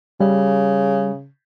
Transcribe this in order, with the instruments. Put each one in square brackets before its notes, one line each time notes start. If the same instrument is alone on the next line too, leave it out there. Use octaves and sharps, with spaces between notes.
[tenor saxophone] C#3 [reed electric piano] G3